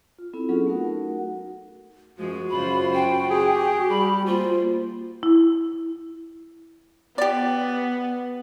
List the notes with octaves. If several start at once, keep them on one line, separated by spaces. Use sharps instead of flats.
F4
B3 C4 E4 A4
F#3 B3 C#4 F4 G#4 A4
A3 D#4 F#4 A#4 F#5
F#2 F3 G#3 F#4
F#2 C#3 F4 C5 B5
G5
G4 G#4
G3 B5
A#3 F4 C5
E4
B3 G4 D5